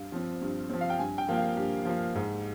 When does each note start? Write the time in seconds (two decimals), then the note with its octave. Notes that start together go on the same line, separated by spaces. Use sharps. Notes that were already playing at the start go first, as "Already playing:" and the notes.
Already playing: G2 F5
0.12 F3 C4
0.42 G2
0.70 F3 C4
0.81 F5
0.90 G5
0.99 G2 G#5
1.18 G5
1.28 F3 A#3 G5
1.38 F5
1.57 G2 G4
1.85 F3 A#3
2.15 G#2